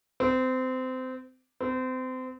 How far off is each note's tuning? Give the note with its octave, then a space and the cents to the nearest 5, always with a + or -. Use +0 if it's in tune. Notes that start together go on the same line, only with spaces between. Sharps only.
C4 -25
C4 -30